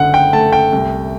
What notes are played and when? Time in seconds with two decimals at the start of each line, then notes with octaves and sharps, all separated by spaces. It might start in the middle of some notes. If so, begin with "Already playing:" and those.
Already playing: F#1 F#2 D3 F#5
0.14 G5
0.33 A3 A5
0.53 G5
0.72 C2